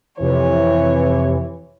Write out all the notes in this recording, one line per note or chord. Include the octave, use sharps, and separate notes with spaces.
F2 C3 E3 C#5